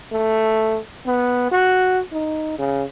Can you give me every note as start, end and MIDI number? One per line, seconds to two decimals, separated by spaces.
0.12 0.78 57
1.06 1.50 59
1.52 2.01 66
2.12 2.55 63
2.59 2.84 49